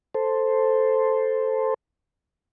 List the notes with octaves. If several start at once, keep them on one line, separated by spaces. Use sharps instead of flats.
A4 C5